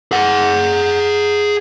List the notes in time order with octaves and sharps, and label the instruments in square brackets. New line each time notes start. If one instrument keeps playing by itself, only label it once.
[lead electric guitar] G#4 F#5